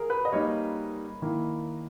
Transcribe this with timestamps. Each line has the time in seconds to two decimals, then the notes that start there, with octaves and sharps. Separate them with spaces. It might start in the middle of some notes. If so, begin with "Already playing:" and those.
Already playing: G#4 A#4
0.10 B4
0.25 D#5
0.32 G3 A#3 D#4 C#5
1.22 D#3 A#3 E4